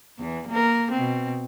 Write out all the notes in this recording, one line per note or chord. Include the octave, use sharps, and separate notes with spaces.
E2 E3
A#3 A#4
B2 C4